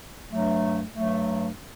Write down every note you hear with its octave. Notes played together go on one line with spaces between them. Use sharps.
G2 F#3 A3
G2 F#3 A3